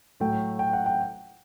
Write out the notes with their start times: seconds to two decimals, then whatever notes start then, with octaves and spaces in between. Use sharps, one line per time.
0.20 A2 F#3 A3 G5
0.59 G5
0.73 F#5
0.86 G5